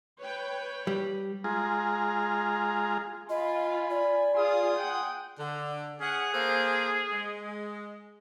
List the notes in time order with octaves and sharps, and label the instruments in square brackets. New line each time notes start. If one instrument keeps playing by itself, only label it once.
[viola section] B4 C#5 G5
[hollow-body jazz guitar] G3
[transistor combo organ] G#3 F4 G#4 A#5
[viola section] F4 [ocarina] D#5 [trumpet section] G#5 B5
[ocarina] D5
[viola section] F4 G#4 F5 [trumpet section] G#5 C6 D#6
[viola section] F#5 G5
[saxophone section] D3
[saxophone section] C#4 F#5 [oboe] G#4
[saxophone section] A#3 A4 C5
G#3